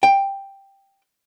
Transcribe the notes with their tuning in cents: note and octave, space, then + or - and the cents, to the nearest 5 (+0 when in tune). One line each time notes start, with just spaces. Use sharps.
G5 +5